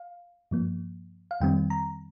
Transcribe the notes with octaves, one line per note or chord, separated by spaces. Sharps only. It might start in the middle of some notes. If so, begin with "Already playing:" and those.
Already playing: F5
G2 F3 A#3
F5
F2 D#3 G3 C4 G5
A#5